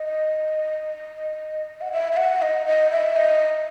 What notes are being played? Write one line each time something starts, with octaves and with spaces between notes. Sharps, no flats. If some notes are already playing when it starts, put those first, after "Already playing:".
Already playing: D#5
F#5
E5
E5
F#5
D#5
D#5
E5
D#5